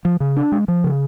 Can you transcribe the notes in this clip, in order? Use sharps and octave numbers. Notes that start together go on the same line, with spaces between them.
F3
C#3
D4
G#3
F3
C#3